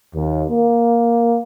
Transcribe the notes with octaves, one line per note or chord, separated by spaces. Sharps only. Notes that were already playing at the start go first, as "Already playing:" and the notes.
D#2
A#3